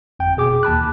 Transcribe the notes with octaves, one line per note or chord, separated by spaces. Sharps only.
G1 F2 G5
B2 G#4 D6
D#2 A5 B5 F#6